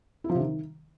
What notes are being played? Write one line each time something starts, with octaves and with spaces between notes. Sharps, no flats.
E4
F3
C3
D#3